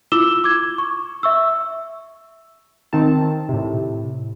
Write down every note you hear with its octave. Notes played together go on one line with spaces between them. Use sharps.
E4 F4 D6 E6 E7 G7
D6 G#6
C#6
E5 C#6 E6
D#3 C4 D#4 A5
A2 C3